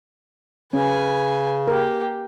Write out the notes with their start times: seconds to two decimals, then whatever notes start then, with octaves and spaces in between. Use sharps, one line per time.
0.73 C#3 C#4 B4 G#5
1.68 A#3 G4 A#4